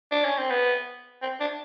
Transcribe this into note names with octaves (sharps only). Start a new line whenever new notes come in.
D4
C#4
C4
B3
C4
D4